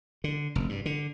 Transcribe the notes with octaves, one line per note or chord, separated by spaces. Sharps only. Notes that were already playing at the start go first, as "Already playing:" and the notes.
D3
F1
G2
D3